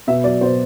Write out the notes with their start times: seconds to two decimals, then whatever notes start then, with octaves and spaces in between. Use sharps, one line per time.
0.07 B2 E5
0.24 F#3 D5
0.41 B2 C5